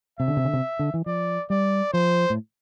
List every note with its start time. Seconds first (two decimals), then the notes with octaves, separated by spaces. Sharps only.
0.19 C3 E5
0.28 D3
0.37 C3
0.45 D3
0.54 C3
0.79 D3
0.94 E3
1.06 F3 D5
1.50 G3 D5
1.93 F3 C5
2.30 A2